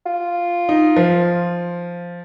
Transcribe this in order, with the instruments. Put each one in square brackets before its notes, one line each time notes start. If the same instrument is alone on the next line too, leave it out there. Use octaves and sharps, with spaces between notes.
[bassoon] F4
[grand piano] D#4
F3